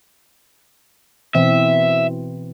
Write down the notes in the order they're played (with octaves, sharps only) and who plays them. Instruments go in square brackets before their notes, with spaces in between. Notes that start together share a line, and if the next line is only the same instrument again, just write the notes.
[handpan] B2 E3 C4 [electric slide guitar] E5